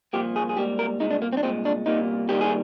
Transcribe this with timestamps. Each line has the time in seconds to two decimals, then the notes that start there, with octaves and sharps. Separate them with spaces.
0.13 C2 A#2 F3 A#3 G4
0.36 G#4
0.49 G#4
0.57 G#2 G3 A#3 G4
0.79 A#4
1.00 C2 A#2 G#3 D#4
1.11 D4
1.22 A#3
1.33 C4
1.37 D4
1.43 C2 A#2 G#3 C4
1.65 D4
1.86 C2 A#2 G3 A#3 D#4
2.29 G2 D#3 G3 A#3 G4
2.41 G#4